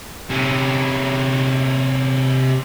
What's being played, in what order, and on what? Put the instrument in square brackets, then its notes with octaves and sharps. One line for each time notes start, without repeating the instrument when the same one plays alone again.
[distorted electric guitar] C3 C#4